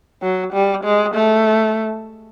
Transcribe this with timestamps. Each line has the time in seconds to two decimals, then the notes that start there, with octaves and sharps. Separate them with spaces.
0.22 F#3
0.53 G3
0.84 G#3
1.15 A3